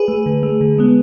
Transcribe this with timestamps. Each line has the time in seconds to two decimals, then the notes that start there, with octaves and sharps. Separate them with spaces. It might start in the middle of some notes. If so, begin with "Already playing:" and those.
Already playing: G#4 B4
0.08 A3
0.26 D3
0.43 A3
0.61 D3
0.78 G#3 B3